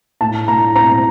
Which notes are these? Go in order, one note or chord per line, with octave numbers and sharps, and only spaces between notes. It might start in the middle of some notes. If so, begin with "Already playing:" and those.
A2 A5
A2 A#5
C4 A#5